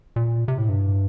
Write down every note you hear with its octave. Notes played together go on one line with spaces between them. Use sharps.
A#2
C3
A2
G2